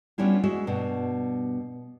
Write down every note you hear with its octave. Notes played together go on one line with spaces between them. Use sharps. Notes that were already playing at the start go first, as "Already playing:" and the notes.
G3 B3 C#4 D4 E4 F4
G#3 F#4 E5
G2 B2